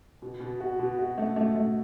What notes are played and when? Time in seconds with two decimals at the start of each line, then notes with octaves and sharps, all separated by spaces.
0.22 B2
0.41 B2
0.60 F#4
0.79 B2
0.98 F#4
1.18 A3
1.36 A3
1.56 A3